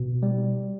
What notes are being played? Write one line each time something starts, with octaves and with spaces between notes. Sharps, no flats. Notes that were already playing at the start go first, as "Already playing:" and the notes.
Already playing: B2
G3